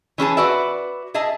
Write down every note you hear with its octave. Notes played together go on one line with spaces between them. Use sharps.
E3 C#4 G#4 A5
F#4 B4 D5 E5
G#4 D#5 E5 A5